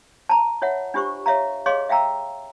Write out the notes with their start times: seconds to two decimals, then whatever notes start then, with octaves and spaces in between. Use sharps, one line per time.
0.29 A5 A#5
0.62 F4 C#5 E5 F#5
0.94 D4 F4 G4 C5 C#6
1.26 C#5 E5 F5 A#5
1.66 G#4 C#5 D#5 F5 C6 D6
1.89 E5 F5 G5 A#5 E6